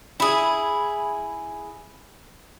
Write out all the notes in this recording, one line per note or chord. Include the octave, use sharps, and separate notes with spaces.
E4 G#4